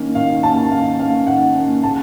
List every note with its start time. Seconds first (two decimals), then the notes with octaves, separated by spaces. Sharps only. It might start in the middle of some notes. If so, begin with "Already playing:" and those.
Already playing: D#3 A#3 C#4
0.15 D#3 F5
0.43 A#3 C#4 A5
0.71 D#3 F5
0.99 A#3 C#4 F5
1.27 D#3 F#5
1.54 A#3 C#4
1.83 C#3 A5